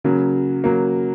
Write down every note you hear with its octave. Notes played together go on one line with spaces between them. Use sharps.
C#3 F#3 A#3
C#3 F#3 A#3